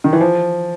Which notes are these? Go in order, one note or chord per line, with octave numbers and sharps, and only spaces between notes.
D#3
E3
F3